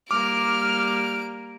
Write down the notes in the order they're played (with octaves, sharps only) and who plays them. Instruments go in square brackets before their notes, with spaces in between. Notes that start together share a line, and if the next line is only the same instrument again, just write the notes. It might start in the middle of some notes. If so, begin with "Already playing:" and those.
[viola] G3 A#3 [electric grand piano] D6 [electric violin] F6 [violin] D7